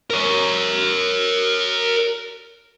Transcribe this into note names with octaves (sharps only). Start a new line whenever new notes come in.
A#4 C#5